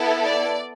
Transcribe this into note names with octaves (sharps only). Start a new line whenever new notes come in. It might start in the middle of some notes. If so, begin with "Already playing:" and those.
Already playing: B3 E4 A4
D5